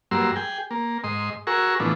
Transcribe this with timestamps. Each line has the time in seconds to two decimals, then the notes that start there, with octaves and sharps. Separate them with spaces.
0.11 G2 F#3 A#3 C6 E6
0.36 G#4 G5
0.71 A#3
1.04 G#2 D#5 C6
1.47 F#4 G#4 A#4 C#6 E6
1.80 A2 E3 F3 B3 D4